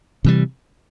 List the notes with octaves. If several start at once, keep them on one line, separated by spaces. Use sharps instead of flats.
C3 E3 G3